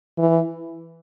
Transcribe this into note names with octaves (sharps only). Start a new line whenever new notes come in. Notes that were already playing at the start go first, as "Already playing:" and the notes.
E3